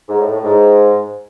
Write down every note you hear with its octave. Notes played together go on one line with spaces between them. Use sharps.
G#2
A2
A2
G#2